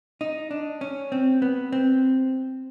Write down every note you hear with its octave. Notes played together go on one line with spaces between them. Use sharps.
D#4
D4
C#4
C4
B3
C4